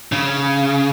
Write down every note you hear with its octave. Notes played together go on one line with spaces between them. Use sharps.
C#3